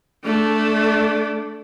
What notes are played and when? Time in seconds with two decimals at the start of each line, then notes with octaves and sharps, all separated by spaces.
0.24 A3 D4